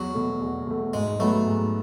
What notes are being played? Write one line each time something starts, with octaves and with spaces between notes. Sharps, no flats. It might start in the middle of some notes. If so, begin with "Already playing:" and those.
Already playing: E2 F#3
B2 A3
E2
B2 A3
G#2 G#3
F#3 A3 B3
G#2